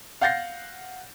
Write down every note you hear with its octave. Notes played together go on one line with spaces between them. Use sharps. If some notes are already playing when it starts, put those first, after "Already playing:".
F5 F#5 G6 A6 A#6 C7